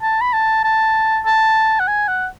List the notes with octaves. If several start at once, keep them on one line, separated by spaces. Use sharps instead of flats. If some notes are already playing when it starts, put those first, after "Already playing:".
A5
B5
A5
A5
A5
F#5
G#5
F#5